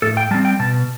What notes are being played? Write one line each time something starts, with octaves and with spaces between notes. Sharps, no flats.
A2 A4
G5
G3 C4 A5
G5
B2 A5